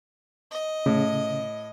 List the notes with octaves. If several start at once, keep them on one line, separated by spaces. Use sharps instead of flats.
D#5
A2 C#3